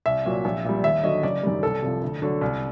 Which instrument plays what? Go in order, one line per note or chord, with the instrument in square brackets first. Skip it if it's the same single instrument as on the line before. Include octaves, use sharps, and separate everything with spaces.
[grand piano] C2 E5
A#2 F#3
A#1
A#2 G3
D#2 E5
D3 F#3 D#5
F#1 D5
F#2 D#3 G3
C2 A4
C3 F3
D2
D3 F#3
C2